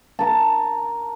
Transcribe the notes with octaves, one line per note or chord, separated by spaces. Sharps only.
A#4 A5